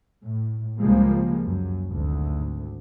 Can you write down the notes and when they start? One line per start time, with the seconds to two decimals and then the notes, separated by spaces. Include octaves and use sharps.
0.24 A2
0.78 C#2 F3 G3 G#3 A#3
1.43 F#2
1.86 G#1 D2